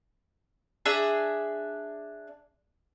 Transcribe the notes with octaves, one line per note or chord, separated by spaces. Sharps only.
D4 G#4 E5